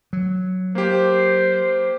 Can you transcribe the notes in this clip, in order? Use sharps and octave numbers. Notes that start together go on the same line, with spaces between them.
F#3
A#3 G4 C5